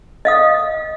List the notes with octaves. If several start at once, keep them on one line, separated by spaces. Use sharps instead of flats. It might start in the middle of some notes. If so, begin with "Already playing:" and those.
D#5 F5 D#6